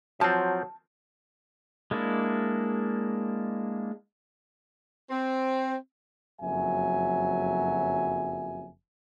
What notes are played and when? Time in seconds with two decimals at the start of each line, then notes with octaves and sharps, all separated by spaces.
0.21 F3 F#3 C4 A5
1.91 G#3 A#3 D4 E4
5.09 C4
6.40 F#1 F2 F#3 E5 G#5